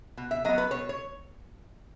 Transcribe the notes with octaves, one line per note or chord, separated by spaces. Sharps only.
B2
E5
F#3 B3 D#5
B4
B2 C#5
C#5